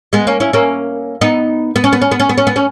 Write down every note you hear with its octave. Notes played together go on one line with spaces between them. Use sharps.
G#3 B3
A#3 C#4
C#4 E4
A#3 C#4
B3 D#4
B3
C#4
B3
C#4
B3
C#4
B3
C#4
B3
C#4